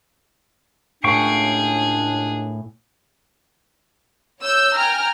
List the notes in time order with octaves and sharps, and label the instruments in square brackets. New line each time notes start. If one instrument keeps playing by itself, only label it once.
[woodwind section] C#2 F#2 D4 [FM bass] A2 [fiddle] G#4 [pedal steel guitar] F5 G5 C#6
[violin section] C#5 E6 G6
G5 G#5 A#5 F6